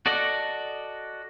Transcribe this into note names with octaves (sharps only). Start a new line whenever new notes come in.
F#4 A4 D5 D#5 F#5